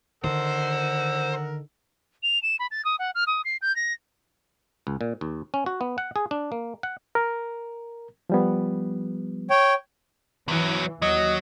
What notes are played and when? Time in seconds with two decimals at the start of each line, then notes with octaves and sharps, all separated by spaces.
0.24 D3 D#3 A#4 C5 F#5 E6
2.23 F7
2.43 E7
2.59 B5
2.71 A6
2.85 D#6
2.99 F#5
3.15 F6
3.27 D#6
3.45 C7
3.62 G6
3.76 A#6
4.87 C#2
5.01 A#2
5.21 D#2
5.54 C#4
5.66 F#4
5.81 B3
5.98 F#5
6.16 G#4
6.31 D4
6.52 A#3
6.83 F#5
7.15 A#4
8.30 F3 G3 B3
9.50 C#5 G5
10.48 E2 E3 F#3
11.02 D#2 F#3 D#5